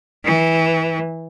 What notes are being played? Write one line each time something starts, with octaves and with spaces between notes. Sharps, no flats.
E3